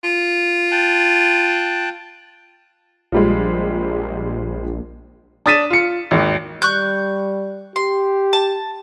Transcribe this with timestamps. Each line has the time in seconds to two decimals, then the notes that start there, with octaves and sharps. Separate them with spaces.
0.04 F4
0.72 G5 A5 F#6
3.12 A#1 F3 G3 G#3
5.46 D4 D#6 A6 B6 D#7 E7
5.70 F4 C#7
6.11 G#1 D#2
6.62 G3 C#6 F#6 G6
7.76 G4 C6
8.33 A5